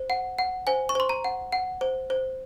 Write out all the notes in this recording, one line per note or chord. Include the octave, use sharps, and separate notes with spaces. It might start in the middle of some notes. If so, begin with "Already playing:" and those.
Already playing: C5
F#5
F#5
C5 G#5
C#6
C5 C6
A#5
F#5
F#5
C5
C5